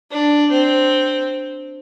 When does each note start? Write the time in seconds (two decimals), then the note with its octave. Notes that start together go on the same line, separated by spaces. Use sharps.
0.11 D4
0.51 C4